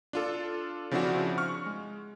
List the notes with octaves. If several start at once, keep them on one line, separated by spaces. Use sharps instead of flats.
D4 F4 A4
C#3 F3 C4 D4 E4 F#4
C#6 F6
G#3